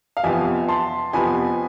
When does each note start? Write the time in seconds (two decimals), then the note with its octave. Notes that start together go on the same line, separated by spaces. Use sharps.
0.17 F5
0.24 F2 C3 F3 B3 E5 G#5
0.69 A5 C6
1.13 F2 C3 F3 B3 G#5 B5